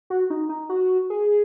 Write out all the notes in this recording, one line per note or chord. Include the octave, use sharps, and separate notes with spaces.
F#4
D#4
D#4
F#4
G#4